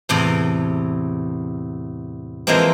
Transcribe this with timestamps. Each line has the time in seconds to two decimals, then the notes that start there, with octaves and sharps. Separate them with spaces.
0.09 E2 A2 C3
2.47 E3 F3 G#3 A#3 C4